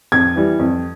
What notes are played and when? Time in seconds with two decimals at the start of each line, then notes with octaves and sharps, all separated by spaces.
0.12 F2 G#6
0.36 E3 G3
0.59 F2